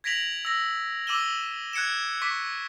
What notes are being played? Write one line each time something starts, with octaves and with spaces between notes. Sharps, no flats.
G#6 A#6 B6 D7 F7 F#7
E6 A#6 F#7
D6 E6 D#7 E7 G7
F#6 G#6 C#7 D7 E7
C#6 D6 B6